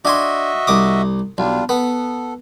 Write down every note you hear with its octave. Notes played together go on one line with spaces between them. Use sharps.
D4 F#4 D#5 E5 G#5 C6
C2 D6 D#6
B1 G3 D4 F4
B3 A4